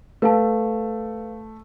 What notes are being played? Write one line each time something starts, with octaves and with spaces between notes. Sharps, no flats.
A3 B4 F5 A5